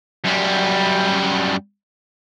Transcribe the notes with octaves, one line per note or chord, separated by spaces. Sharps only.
F#2 G3